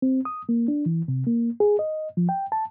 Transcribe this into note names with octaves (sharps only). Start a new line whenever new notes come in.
C4
D#6
A#3
D4
E3
C3
A#3
G#4
D#5
F3
G5
A5